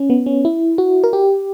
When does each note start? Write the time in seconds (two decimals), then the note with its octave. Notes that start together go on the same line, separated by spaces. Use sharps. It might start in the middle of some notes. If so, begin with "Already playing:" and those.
Already playing: C#4
0.10 B3
0.26 C#4
0.45 E4
0.78 F#4
1.04 A#4
1.13 G4